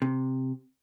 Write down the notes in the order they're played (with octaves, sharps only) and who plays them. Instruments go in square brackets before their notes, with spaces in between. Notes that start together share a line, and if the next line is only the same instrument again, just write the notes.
[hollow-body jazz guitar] C3